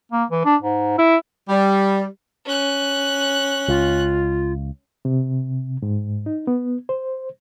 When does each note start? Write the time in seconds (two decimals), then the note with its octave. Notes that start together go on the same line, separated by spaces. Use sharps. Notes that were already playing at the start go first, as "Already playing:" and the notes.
0.12 A#3
0.31 E3
0.45 D4
0.62 G#2
0.98 E4
1.49 G3
2.46 C#4 F#6
3.68 C#2 F4
5.05 C3
5.82 G#2
6.26 D#4
6.47 B3
6.89 C5